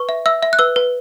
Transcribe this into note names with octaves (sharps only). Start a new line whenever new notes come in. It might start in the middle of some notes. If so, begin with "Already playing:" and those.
Already playing: B4 C#6
E5
E5 E6
E5
F#6
B4 E6
B4